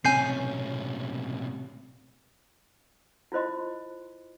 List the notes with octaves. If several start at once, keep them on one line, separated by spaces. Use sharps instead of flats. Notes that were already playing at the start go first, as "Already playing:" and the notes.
B1 A2 C3 C#4 G#5 G6 C7
E4 F4 C5 D#5 C6